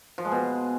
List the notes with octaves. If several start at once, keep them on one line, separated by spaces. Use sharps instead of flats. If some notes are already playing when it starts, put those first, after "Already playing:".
F3
G#3
B2